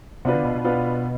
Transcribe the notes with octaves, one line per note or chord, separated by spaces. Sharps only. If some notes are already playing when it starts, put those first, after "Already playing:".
C3 B3 D4 F4 B4
D3
B2
B2
B3 D4 F4 B4